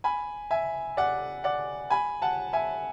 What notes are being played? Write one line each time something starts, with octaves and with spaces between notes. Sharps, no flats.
G#5 B5
E5 G#5
D5 F#5
D5 F#5
G#5 B5
F#5 A5
E5 G#5